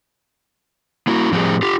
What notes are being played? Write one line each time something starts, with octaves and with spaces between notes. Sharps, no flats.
A#3 E4 F#4
A2 F3 C4 G4 G#4
F4 G4